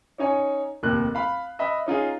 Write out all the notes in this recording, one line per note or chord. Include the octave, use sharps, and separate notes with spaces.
C#4 D#4 C#5 G#5
F1 D#2 F#6
F5 B5
D#5 E5 B5
C#4 D#4 F4 G#4